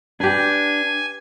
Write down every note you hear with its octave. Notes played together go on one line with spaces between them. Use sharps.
D4 G4 B4 G#5